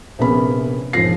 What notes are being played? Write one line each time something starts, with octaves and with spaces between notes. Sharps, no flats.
A#1 C3 A#3 B3 C#4 B5
E1 G#2 F3 A#6 C7